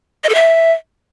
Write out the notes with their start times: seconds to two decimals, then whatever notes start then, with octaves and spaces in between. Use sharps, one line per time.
0.24 D#5
0.29 A4
0.35 E5